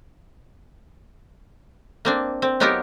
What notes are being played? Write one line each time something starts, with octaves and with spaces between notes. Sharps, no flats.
A#3 C4 D4
C4
F#3 B3 D#4 F4 G4 A#4